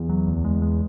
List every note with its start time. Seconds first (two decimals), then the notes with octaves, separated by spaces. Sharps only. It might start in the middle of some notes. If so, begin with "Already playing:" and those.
Already playing: E2
0.09 F#3
0.27 D2
0.45 G#3
0.62 G#3